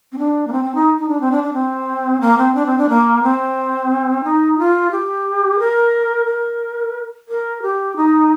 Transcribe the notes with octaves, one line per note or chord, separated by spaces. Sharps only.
C4
D4
A#3
C4
C4
D#4
D#4
D4
C4
D4
D4
C4
A#3
C4
D4
C4
D4
A#3
C4
D#4
F4
G4
A#4
A#4
A#4
G4
D#4